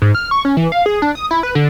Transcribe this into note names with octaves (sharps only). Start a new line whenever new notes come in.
G#2
F6
C#6
C#4
E3
F5
G#4
D4
D#6
E4
B4
D3